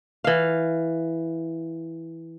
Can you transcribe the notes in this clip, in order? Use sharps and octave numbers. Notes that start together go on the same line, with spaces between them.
E3 F5